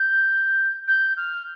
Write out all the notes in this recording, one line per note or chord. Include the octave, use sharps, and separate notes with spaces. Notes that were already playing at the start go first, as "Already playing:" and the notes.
Already playing: G6
G6
F6